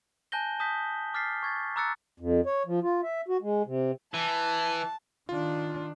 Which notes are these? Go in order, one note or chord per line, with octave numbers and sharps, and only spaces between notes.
G#5 A5 F#6 G6 A#6 G7
A5 D#6 G6 B6
D6 F6 A6 B6 C7
C#6 G#6 A6
A#5 D6 E6 F#6 A6 C#7
F2
C#5
F3
F4
E5
F#4
G#3
C3
E3 A5
D#3 D4 F4